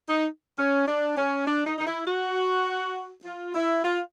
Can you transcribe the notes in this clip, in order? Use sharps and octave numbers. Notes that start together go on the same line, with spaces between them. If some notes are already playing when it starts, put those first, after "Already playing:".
D#4
C#4
D4
C#4
D4
D#4
D#4
E4
F#4
F4
E4
F4